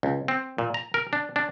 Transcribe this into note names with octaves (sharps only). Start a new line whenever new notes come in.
C#2
C4
A#2
A#5
A#4
D4
D4